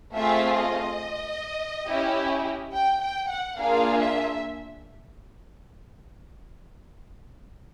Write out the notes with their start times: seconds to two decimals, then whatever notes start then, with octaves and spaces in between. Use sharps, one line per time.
0.14 A3 C4 F4 G#4 E5
0.57 D#5
1.87 C#4 E4 G4
2.73 G5
3.01 G5
3.30 F#5
3.58 A#3 D4 F4 G#4 F5
4.01 E5